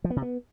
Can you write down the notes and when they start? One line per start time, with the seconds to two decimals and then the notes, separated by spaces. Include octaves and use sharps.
0.04 F3
0.10 B3
0.16 C3
0.22 B3